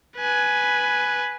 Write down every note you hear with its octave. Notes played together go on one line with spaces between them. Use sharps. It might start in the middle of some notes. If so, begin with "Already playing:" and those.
B4 G#5